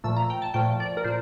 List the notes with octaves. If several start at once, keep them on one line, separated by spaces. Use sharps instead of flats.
A#2 F3 A3 E6
A#5
G5
A5
A#2 F3 A3 G5
D5
A#4
A#2 C5